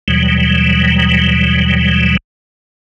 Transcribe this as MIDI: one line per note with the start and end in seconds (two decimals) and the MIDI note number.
0.08 2.17 39
0.08 2.17 47
0.08 2.17 52
0.08 2.17 54
0.08 2.17 55